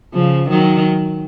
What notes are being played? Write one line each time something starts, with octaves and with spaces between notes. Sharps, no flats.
C#3 F3
D#3 F#3